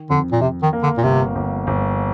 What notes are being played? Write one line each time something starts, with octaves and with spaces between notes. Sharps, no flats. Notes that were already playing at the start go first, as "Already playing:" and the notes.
Already playing: D#3
F2 D3
A#2
F2 C3
D#3
A#3
D3
A#2
G1 C3
G1
G1